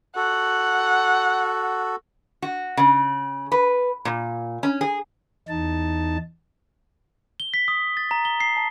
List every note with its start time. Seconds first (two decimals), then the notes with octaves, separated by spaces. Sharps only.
0.16 F#4 A4 F#5
2.42 F#4
2.77 C#3
3.52 B4
4.05 A#2
4.63 C#4
4.81 G#4
5.48 E2 D#4 A5
7.40 G7
7.54 B6
7.68 D#6
7.97 A6
8.11 A#5
8.25 G7
8.40 C7
8.57 A5